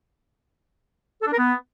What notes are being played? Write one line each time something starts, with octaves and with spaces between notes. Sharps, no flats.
A4
D4
A#4
B3